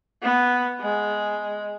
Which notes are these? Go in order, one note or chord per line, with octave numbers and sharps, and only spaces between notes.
B3
G#3